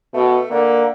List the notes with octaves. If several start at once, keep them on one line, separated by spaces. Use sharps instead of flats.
B2 A3
D3 A#3